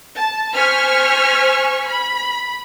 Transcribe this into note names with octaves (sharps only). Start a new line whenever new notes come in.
A5
C5 G#5 C#6 F6 B6
B5